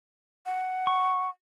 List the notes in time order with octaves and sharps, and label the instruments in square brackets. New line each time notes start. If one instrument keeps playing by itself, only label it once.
[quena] F#5
[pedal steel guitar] C#6